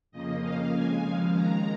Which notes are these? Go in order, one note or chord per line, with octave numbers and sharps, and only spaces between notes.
F2 C#3 F3 A#3 D#5
F2 C#3 A#3 F5
F2 C#3 G#3 G#5
D#2 C#3 F3 G#3 F5
D#2 D#3 G#3 A#5